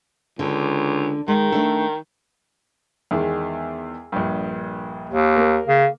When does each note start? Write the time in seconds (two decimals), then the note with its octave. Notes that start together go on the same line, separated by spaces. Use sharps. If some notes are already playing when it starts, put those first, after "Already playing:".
0.39 C#2 D3
1.28 D#3 G#3
1.52 A3 D4 A4
3.11 E2 D#3 G#3
4.12 A#1 G2
5.10 D#2
5.36 A#3 A#4
5.68 C#3